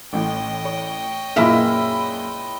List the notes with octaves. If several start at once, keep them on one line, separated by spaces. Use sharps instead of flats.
A1 A2 D#5 G5
C#5
F#2 A#2 G#3 A#3 E4 B4 E5